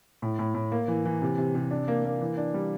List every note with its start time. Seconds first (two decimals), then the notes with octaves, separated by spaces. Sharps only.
0.22 A2
0.39 A2
0.54 A2
0.72 A#3
0.88 E3
1.05 E3
1.22 C3
1.38 C3
1.55 C3
1.71 D4
1.88 A#3
2.05 A#3
2.21 E3
2.37 D4
2.54 G3